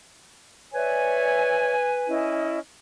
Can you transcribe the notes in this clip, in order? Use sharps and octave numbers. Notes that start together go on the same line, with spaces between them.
B4 C#5 D5 E5 G#5
C#4 E4 D#5